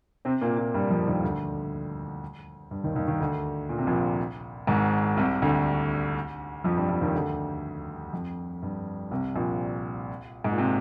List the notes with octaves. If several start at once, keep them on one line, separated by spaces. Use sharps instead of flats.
C3 C4
A#2 A#3
A#2 A#3
G2 G3
F2 F3
D#2 D#3
D2 D3
G2
D#2 D#3
D#2 D#3
D#2 D#3
D2 D3
A#2
C3
A#1 A#2
G#1 G#2
C2 C3
D2 D3
F2 F3
G2 G3
F2 F3
D#2 D#3
D2 D3
F2
G2
C2 C3
A#1 A#2
G#2
A#2
C3